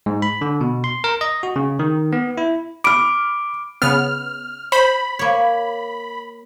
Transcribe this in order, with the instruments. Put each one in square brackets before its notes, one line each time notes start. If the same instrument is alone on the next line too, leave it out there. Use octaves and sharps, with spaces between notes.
[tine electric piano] G#2
B5
D3
B2
C6
A#4
D#5
F#4
C#3
D#3
B3
E4
[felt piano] B5 F6 [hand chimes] D6 D7
[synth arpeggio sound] C#3 B3 [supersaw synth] F6
[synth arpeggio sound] C5 [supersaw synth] B5
[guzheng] A#3 C#5